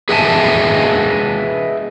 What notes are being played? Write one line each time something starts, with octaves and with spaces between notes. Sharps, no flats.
G#4 B4 D#5 E5 G#5 A5